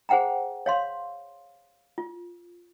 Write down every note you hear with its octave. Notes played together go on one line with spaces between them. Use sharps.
G#4 C5 F#5 G5 A#5
C#5 F5 C6
F4